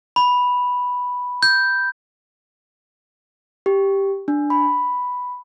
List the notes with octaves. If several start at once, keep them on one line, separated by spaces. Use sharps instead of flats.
B5
G6
G4
D4
B5